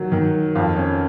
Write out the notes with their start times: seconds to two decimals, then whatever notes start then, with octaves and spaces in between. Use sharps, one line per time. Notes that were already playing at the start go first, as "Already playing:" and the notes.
Already playing: D#3 F#3
0.12 D#3
0.55 F2 F4
0.76 C#4